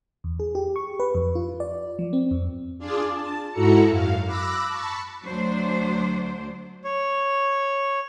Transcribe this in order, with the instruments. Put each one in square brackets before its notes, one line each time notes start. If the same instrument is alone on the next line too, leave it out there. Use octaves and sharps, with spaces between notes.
[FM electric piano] E2
G#4
G4
C#6
B4
F2
F4
D5
F3
C4
F2
[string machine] D4 F4 G#4 D5
A5
G#2 E4 F#4 A4 A#5 C#7
F#2 F5
B5 D6 E6 F#6 A#6
A5 B5 C#6
[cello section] D2 F#3 D4 C5
[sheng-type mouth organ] C#5